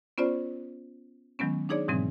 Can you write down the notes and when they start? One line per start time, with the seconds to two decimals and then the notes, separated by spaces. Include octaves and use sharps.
0.18 B3 C#4 F4 C5 D5
1.39 D#3 F#3 G#3 B3 C#4
1.69 D4 D#4 G#4 C#5 D5
1.88 G#2 B2 E3 F#3 G#3 C4